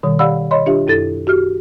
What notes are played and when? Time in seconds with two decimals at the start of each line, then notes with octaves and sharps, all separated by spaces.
0.03 B2 D#3 G3
0.19 G4 D5 F5 F#5 B5 E6
0.51 C#5 D#5 B5 C6
0.66 D4 F4 G4 E5
0.87 F#2 E4 A4 A6
1.27 F#4 G4 F6